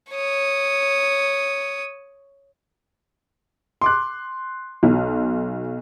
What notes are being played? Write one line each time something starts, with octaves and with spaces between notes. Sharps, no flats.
C#5 D#6
C6 D6 F#6
B1